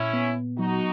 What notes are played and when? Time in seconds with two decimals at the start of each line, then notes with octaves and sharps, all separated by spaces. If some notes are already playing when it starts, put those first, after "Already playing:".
Already playing: A#2 C#4 E4
0.13 B3
0.59 F#3 D#4 F#4